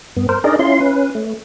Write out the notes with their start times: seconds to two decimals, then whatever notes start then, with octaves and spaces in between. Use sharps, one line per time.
0.16 G2 B3
0.29 A#4 C5
0.44 D4 D#4 G#4 A#4 D5 D#5
0.59 C#4 E4 F4 C6
0.80 C#4 B4
1.15 A3